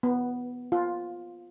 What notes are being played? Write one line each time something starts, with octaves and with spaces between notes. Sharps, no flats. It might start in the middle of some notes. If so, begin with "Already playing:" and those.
B3
F4